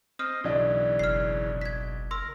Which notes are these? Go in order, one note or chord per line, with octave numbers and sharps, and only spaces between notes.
C4 D#5 D#6 F6
B1 C#3 E3 D4
F#1 F6 C7
G#6 B6
A#4 C6 E6